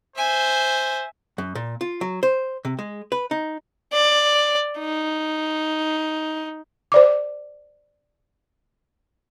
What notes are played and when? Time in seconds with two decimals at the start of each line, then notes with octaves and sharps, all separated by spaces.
0.16 C5 E5 G#5
1.38 F#2
1.55 A#2
1.81 F4
2.01 F#3
2.23 C5
2.65 C3
2.79 G#3
3.12 B4
3.31 D#4
3.93 D5
4.79 D#4
6.92 C5 D5 D6